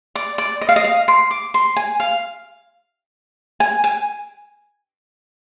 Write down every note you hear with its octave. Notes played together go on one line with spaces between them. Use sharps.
D5
D5
D#5
F5
D#5
F5
C6
D6
C6
G#5
F5
G#5
G#5